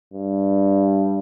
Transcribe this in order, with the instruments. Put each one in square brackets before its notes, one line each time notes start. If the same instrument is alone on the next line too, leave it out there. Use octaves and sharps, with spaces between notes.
[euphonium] G2